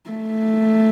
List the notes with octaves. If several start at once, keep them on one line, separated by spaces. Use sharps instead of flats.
A3